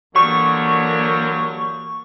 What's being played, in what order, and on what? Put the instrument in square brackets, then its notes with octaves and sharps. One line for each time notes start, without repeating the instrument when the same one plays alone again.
[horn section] D3 F#3 G3 [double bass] E3 A#3 [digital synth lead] C#6